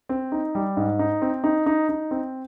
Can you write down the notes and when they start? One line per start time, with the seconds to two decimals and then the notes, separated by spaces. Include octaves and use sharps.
0.09 C4
0.32 D#4
0.55 G3
0.77 G#2
0.99 D#4
1.22 C4
1.44 D#4
1.66 D#4
1.89 D#4
2.11 C4